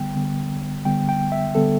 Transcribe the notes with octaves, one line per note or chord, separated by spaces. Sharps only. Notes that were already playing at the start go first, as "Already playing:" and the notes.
Already playing: D3 G3 B3 G5
D3 G3 B3
D3 G3 B3 G5
G5
E5
D3 G3 B3 A4